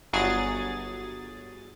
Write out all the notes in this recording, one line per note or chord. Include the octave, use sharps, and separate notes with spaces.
G1 F#3 G#4 A6